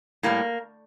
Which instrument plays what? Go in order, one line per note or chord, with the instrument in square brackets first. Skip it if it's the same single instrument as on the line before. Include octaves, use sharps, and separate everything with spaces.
[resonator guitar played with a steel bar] A2 G3 A#3